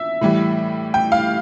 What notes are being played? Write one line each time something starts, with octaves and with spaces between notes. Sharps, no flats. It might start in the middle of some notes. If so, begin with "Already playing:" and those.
Already playing: E5
A2 E3 G3
G5
F5